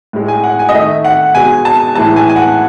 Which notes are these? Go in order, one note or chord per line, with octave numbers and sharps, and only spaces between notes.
A2 G#3
G#5
F#5
G#5
D#5
D#3 A3 E5
F#5
B2 G#3 G#5
A5
A2 E3 G#3 A5
G#5
G#5
F#5